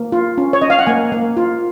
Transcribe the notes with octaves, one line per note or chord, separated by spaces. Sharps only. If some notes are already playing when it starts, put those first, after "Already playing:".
Already playing: A#3
F4
C#4
C#5
C#4 D#5
F5
F#5
A#3 G#5
A#3
F4